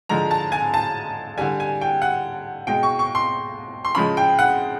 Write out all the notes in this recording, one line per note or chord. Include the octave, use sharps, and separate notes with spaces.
D3 F3 G#3 A#5
A5
G#5
A5
D3 G3 G#5
G#5
G5
F#5
B2 G#3 G5
C#6
C#6
C6
C6
C#3 F3 G#3 B5
G5
F#5